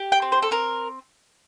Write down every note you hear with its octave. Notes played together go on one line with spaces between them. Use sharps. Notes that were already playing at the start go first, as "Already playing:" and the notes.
Already playing: G4
G5
C4
C5
A4
C4 A#4